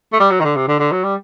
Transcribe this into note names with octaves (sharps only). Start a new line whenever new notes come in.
A3
G3
F#3
D#3
D3
C3
D3
D3
F#3
G3